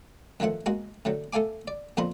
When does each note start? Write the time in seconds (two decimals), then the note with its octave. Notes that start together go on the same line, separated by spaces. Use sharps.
0.40 F#2 D#3 F3 A3 F#5
0.66 G#3 A#3 F#4
1.05 A2 D3 F#3
1.33 A3 A4 F5 G#5 D6
1.68 D5
1.97 F2 A#2 F3 A#4 B5 C6